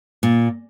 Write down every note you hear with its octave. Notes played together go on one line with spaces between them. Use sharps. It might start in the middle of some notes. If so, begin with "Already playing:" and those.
A#2